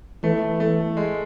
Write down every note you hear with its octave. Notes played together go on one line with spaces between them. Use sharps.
E3 A3
A3
G#3